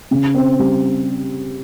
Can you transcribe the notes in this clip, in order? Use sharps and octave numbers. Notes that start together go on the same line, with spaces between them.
C#3
C4
G3